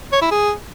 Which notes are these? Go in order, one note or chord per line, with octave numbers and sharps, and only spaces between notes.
C#5
E4
G#4